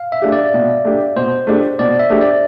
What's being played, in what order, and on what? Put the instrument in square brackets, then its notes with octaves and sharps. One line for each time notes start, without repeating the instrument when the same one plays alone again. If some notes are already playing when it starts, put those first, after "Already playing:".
Already playing: [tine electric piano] F5
E5
[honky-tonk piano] A3 D4 G4
[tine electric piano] D5
[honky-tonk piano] B2
A3 D4 G4
[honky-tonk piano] B2 [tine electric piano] C5
[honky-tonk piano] A3 D4 G4
[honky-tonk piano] B2 [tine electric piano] D5
[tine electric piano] E5
[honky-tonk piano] A3 D4 G4
[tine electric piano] D5